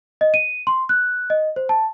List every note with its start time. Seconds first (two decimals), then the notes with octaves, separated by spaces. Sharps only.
0.21 D#5
0.34 D#7
0.67 C6
0.89 F#6
1.30 D#5
1.56 C5
1.69 A5